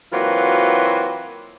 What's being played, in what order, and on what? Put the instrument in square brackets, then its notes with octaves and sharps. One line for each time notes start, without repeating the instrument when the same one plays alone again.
[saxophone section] E3 F#3 A#3 C4 F4 F#4